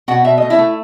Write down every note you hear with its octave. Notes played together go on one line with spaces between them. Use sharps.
B2 F#4 F#5
B2 E5
A3 D#5
E4 E5
A3